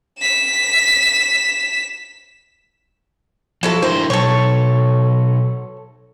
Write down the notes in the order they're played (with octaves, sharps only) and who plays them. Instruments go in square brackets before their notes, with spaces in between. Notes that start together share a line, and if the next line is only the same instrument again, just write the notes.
[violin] B6 E7
[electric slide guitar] F3 [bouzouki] F#3 E4 A4
[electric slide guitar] D4 E4 A#4 [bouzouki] C5
[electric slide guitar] B2 F#3 [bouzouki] A4 C#5